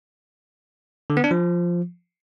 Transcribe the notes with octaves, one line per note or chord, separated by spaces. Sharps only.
D3
B3
D4
F3